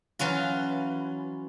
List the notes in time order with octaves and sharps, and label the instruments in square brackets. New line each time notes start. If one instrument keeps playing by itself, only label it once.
[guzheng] E3 F#3 C#4 F4